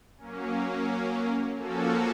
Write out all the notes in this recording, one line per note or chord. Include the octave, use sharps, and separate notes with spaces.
F#3 A#3 C#4
F3 A#3 C#4 F#4 A4